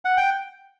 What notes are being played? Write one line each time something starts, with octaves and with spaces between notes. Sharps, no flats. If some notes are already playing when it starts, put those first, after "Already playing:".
F#5
G5